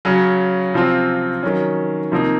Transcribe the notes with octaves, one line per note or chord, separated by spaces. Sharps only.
C#3 F#3 C#4
C3 F3 C4 F4
D#3 F#3 C#4
C3 F3 A#3 D#4